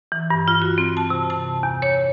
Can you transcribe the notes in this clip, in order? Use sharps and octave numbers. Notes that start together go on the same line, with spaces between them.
E3
G2
F4
F#4
C4
A5
C3
A5
E2
C#5